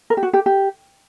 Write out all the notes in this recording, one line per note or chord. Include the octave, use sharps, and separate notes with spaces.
A#4
G4
F#4
G4
G4